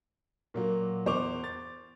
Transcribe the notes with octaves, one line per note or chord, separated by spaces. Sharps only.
A#2 F#3 A#3
E2 C5 C#6 D6 F7
A6